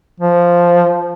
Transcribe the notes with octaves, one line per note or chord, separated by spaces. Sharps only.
F3